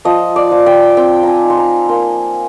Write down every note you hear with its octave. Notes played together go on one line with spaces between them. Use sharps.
F3 D#5
D5
F3
G5
C4 G5
G#5 A#5
D#4
C6
A#5
A#3 C6